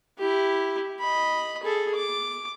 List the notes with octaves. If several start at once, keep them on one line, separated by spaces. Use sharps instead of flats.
E4 G4
D#5 B5
G#4 A4
D6